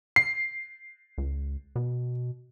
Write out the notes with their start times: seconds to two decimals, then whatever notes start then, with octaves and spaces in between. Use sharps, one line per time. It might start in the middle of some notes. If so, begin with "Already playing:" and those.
0.16 C7
1.18 C#2
1.76 B2